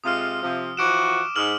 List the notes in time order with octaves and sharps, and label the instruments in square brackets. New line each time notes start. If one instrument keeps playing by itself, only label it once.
[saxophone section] C3 G#3 F4 [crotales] D#6 F6
[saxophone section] C3 F3
[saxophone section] E3 F3 F#4 [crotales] D6 D7 E7
[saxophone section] G#2 [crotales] F6 F#7